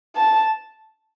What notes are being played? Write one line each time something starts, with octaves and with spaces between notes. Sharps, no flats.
A5